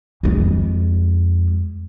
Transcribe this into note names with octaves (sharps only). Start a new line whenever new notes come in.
F2 G#3